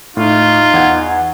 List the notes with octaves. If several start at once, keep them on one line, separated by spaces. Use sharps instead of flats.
A2 D#4 F4
E2 F#5 G#6